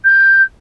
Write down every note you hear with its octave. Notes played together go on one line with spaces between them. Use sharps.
G6